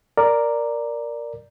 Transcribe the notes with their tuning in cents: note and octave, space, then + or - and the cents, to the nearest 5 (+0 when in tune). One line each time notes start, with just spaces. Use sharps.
A#4 +0 D5 +0